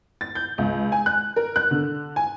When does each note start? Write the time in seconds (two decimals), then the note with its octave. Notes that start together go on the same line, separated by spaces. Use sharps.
0.21 A6
0.35 G6
0.58 C#2
0.92 G#5
1.06 F#6
1.36 A#4
1.56 F#6
1.71 D3
2.16 G#5